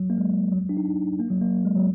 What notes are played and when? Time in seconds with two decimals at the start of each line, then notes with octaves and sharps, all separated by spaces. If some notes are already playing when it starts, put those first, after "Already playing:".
Already playing: F#3
0.10 A#3
0.18 G#3
0.51 F#3
0.69 D4
0.77 D#4
0.85 D4
1.19 A#3
1.30 F#3
1.42 A#3
1.65 G#3
1.76 F#3